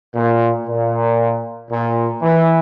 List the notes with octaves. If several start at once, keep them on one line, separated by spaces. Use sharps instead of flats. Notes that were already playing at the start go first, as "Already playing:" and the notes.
A#2
A#2
A#2
E3